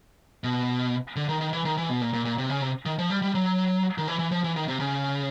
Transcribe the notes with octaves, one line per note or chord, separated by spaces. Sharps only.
B2
D3
D#3
D#3
E3
D#3
E3
B2
A#2
A#2
A#2
C3
C#3
C3
D#3
F3
G3
G3
F#3
D#3
E3
E3
F3
E3
D#3
C3
C#3